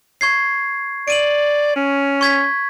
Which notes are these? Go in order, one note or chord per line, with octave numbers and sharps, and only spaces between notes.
C#6 G#6 C7
D5 D7 D#7 F#7
C#4
C#6 G#6 B6